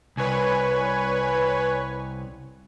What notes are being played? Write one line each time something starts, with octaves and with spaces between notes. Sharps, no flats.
C2 B4 C#5 G#5